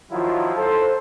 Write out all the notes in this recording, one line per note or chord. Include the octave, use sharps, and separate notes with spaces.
D#3 F3 F#3 E4 F4
A4 C5